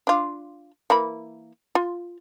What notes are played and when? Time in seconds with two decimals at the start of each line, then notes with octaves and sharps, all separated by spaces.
0.07 D4 F4
0.90 E3 A#3 B5
1.75 F4